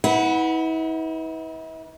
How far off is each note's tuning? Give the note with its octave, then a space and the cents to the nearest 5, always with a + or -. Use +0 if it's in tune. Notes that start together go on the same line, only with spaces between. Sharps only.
E4 -45 B4 +0 F#5 +0